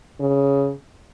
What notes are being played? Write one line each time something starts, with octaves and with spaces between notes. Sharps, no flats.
C#3